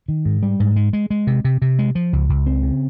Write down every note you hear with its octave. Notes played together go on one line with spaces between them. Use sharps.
D#3
G#2
G3
G#2
G#3
G#3
G#3
C3
C3
C3
G#3
F3
C#2
C#2
C4
C#3